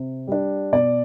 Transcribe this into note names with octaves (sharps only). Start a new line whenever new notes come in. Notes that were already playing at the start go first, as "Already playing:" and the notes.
Already playing: C3
G3 D4
B2 D5